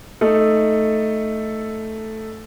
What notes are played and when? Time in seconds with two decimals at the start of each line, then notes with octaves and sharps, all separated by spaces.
0.21 A3 D#4 A4